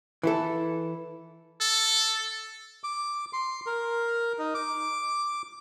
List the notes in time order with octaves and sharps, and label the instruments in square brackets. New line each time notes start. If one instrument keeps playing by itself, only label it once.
[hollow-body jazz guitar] E3 E4 A4
[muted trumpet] A4
[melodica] D6
C6
A#4
D#4
D6